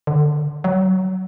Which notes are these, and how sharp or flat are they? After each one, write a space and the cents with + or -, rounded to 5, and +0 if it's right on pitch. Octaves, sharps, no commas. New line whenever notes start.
D3 +20
F#3 +20